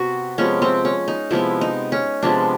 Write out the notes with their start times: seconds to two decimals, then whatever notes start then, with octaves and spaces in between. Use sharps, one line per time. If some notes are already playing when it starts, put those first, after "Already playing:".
Already playing: C3 B3 F#4
0.38 C3 F3 G#3 B3 C#4
0.62 C4
0.85 C#4
1.08 D#4
1.31 C3 F3 G#3 B3 E4
1.61 D#4
1.92 C#4
2.23 C3 F3 G#3 B3 D4